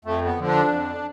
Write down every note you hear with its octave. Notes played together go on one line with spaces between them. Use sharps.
F2 A3
B3
D3 F3
D4
F2